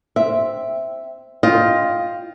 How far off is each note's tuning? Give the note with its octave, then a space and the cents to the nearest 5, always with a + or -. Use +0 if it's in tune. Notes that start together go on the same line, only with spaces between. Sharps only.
C4 +0 E5 +0
F4 +0 D#5 +20 G5 +0